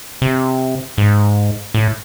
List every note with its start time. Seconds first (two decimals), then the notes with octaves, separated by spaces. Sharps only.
0.22 C3
0.98 G#2
1.74 A2